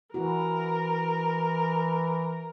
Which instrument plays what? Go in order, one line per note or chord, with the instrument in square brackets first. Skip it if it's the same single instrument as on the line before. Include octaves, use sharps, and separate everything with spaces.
[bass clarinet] E3 [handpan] E4 F#4 [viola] A#4